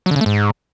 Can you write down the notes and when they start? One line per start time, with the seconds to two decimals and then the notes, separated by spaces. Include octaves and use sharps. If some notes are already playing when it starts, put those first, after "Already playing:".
0.06 F#3
0.11 D3
0.16 C#3
0.21 A3
0.26 G#2